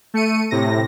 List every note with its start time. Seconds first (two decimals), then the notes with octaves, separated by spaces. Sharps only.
0.14 A3 C#7 D#7
0.51 A2 C3 A#6